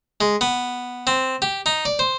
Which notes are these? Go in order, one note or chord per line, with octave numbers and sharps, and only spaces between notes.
G#3
B3
C4
G4
D#4
D5
C5